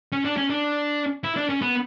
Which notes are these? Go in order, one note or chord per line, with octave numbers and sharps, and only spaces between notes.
C#4
D4
C#4
D4
E4
D4
C#4
B3